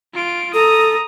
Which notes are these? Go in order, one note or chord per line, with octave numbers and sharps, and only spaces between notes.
F4 D7
A4 A#5 D#6